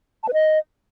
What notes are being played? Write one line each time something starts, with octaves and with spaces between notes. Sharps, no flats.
A5
B4
D#5